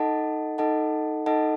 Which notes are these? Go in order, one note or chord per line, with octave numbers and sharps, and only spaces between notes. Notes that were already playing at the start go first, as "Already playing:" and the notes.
Already playing: D#4 A4 D#5 F#5 A5
D#4 A4 D#5 F#5 A5
D#4 A4 D#5 F#5 A5